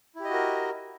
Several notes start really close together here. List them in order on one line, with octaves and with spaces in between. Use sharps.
E4 G4 D#5 F#4 A#4